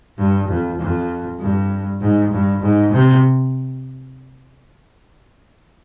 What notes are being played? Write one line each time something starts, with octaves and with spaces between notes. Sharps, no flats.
G2
F2
F2
G2
G#2
G2
G#2
C3